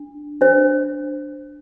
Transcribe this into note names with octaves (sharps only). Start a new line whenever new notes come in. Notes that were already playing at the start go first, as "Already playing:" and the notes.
Already playing: D4
D4 C5